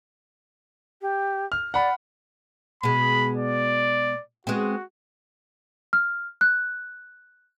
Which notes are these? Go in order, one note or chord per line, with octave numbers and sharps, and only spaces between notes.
G4
F6
D5 F#5 B5
B2 G#3 B5
D5
G#3 B3 C4 F#4
F6
F#6